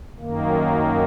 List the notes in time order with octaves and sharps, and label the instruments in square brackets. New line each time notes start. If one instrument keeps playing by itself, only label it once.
[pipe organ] F#2 D#3 A#3